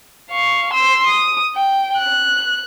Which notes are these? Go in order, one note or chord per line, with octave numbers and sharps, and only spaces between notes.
F5 C#6
C6 E6
D#6
G5
F#6